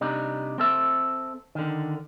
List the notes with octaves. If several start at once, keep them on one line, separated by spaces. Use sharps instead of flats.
C3 G3 D4 D#4
C4 A4 E5
D3 D#3